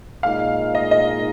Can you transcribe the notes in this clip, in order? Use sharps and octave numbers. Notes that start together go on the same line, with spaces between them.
A#2 G#3 D#4 F5
D#5
D#5